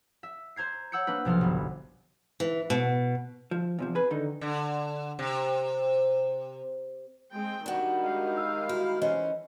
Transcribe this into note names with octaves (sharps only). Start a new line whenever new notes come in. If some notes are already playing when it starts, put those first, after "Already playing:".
E5
C5 A#5 G#6 C7
C#5 F#5 E6 G6 C#7
A#3 D4 B4
B1 C3 F3 A4 F6
G1 B3
E3
B2
F3
E2 C3 F3
G#4 B4
D3 D#3 D#4
D3
C3
G#3 C4 G5
D#3 G3 D4 F#4
G#3 F5
E6
E4 F#4
E3 C#4 C5 D#5